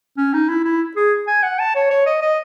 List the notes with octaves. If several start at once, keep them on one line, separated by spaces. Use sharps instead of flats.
C#4
D#4
E4
E4
G#4
G#5
F#5
A5
C#5
C#5
D#5
D#5